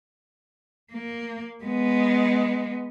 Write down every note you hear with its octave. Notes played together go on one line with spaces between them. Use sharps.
A#3
G#3 B3